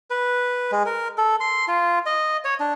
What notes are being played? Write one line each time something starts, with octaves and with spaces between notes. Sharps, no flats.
B4
G#3
A#4
A4
C6
F4
D#5
C#5
D4